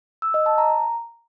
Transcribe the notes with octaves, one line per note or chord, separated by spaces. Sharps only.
E6
D#5
A5
A#5